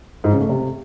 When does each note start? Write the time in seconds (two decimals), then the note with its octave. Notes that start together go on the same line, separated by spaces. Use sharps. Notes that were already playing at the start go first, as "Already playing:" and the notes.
0.24 G#2
0.32 C#3
0.41 A3
0.49 C3